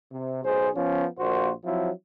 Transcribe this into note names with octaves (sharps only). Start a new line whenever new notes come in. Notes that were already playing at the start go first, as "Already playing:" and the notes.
C3
B1 G#4 C5
F3 B3 C#4
A#1 A#3 F#4 C5
F3 F#3 C4 E4